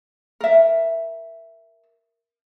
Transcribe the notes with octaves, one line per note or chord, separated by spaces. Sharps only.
A#4 E5